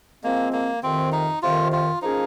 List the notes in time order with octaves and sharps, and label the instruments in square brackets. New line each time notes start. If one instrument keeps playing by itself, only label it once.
[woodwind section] F3 G#3 C4 [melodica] A#3
[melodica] A#3
[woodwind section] F2 C3 D#3 [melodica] C4
[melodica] D#4
[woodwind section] F2 C3 D#3 [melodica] F4
[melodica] F4
[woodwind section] F3 A#3 C#4 G#4 [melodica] D#4